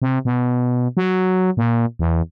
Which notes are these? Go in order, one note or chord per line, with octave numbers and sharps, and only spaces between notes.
C3
B2
F#3
A#2
E2